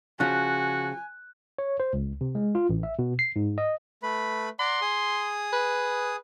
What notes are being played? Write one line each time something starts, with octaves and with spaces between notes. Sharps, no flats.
C#3 F3 F#4 G#5 F#6
C#5
C5
C#2
C3
G#3
F4
A1
E5
B2
C7
G#2
D#5
A3 B4 B5
D5 F#5 A#5 C6
G#4 D#6
B4